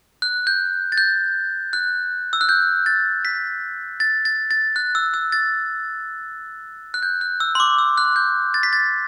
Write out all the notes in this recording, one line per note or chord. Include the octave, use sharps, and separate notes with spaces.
F#6
G6
A6
G6
F#6
E6
F#6
G6
A6
B6
A6
A6
A6
F#6
E6
E6
A6
F#6
G6
F#6
E6
C6
D6
E6
F#6
G6
A6
B6
A6